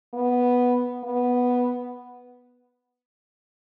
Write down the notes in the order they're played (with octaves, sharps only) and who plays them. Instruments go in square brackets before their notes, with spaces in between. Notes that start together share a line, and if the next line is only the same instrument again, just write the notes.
[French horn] B3
B3